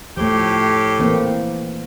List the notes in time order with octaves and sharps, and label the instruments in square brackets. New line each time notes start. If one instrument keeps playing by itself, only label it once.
[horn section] A2 G4 [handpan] F3 A3
[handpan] E3 A#3 C4